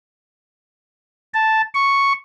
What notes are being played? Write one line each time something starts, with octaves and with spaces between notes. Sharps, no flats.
A5
C#6